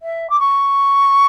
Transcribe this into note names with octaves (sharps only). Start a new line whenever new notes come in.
E5
D6
C#6